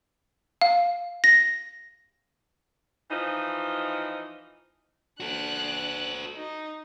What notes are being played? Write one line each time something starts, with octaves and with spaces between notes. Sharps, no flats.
F5
A#6
E3 F3 D#4
D4 F#4 A4 F#6
D#4